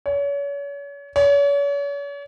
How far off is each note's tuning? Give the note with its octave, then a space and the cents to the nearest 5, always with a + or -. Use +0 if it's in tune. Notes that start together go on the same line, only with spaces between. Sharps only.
C#5 +35
C#5 +40